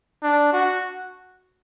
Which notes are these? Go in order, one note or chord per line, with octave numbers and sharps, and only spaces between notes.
D4
F#4